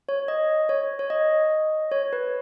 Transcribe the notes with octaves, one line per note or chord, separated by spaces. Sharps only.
C#5
D#5
C#5
C#5
D#5
C#5
B4